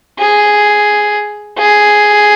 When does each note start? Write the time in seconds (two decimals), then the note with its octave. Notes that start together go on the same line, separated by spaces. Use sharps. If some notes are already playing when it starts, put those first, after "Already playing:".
0.19 G#4
1.58 G#4